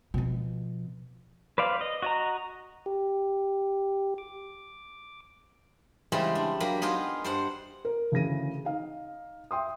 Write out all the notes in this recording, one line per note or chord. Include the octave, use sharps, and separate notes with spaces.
B2 F3
B4 C5 D5 F5
D#5
F#4 D#5 A#5
G4
D6
C#3 E3 G3 G#3 B3 C4
D4
F#3 A#3 G4 B5
B3 D#4 F4 G#4 G5
G2 C5 F#5
A#4
D2 C#3 E3 A#6 D#7
D#4 F5
E5 G5 C6 D#6